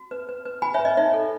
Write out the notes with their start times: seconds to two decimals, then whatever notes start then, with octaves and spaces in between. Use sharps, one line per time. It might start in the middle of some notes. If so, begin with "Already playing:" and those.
Already playing: F#4
0.11 B4
0.29 B4
0.45 B4
0.62 F#4 G#5 B5
0.74 C#5 E5
0.79 B4
0.85 D#5
0.97 D#4 C#5 E5
1.14 A4